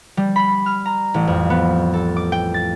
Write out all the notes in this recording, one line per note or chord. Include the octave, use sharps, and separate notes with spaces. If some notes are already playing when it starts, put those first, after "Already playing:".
G3
B5
F6
A#5
A1
F2
B3
A4
D6
G5
A6